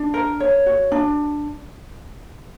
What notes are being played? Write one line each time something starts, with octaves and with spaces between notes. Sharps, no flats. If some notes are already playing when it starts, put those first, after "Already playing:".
Already playing: D4
A#4
C#5
F#4
D4